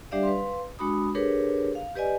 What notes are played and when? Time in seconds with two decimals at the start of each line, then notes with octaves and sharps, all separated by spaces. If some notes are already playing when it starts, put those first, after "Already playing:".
0.11 G3 D4 G4 D5 E5 F5
0.23 B4 F5 C6
0.79 G#3 D4 F#4 B5 D#6
1.15 D4 G4 G#4 A#4 B4 C#5
1.75 F5
1.95 G4 B4 D5 D#5 G#5